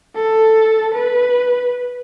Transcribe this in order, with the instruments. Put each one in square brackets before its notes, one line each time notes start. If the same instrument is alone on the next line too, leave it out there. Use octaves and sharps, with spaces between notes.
[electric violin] A4
B4